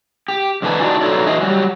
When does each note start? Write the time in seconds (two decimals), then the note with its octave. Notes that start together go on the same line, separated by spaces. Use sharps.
0.28 G4
0.62 F2 D#3 D4 B4 G#5 A#5
0.80 D4 D#4 F#4 D5
1.01 D#4 F#4 A4 C#5 D5
1.26 E3 F#4 D#5 G#5
1.41 F#3 G3